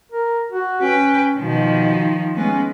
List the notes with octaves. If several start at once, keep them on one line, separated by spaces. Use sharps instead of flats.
A#4
F#4
C#4 B4 G5
B2 D#3 F3
G#3 B3 C#4